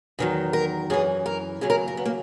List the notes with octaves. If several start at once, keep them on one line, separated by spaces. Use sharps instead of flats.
E2 D#3 F#3
A#4
F#2 E3 G#4
A#4
D#2 C#3 F#3 G#4
A#4
A#4
B3
A#3